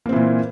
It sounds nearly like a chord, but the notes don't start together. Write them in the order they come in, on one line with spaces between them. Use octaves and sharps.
A#3 C4 E3 A#2